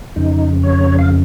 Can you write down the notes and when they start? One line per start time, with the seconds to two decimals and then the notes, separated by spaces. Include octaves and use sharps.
0.16 F2 C#3 D#4
0.63 C#5
0.99 F5